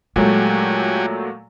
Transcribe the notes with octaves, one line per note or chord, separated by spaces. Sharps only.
A#2 F#3 G#3 A3 F#4 G4 G#5